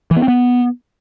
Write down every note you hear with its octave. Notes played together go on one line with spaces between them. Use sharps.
E3
B3
C4
B3